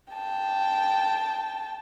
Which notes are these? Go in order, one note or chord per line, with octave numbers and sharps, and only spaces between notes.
G5 A5